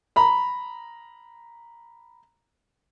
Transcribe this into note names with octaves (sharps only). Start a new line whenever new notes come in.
A#5 B5